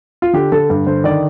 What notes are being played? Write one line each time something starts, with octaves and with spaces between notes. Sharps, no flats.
F4
D3 G4
D3 A4
G2
D3 C5
D#3 D5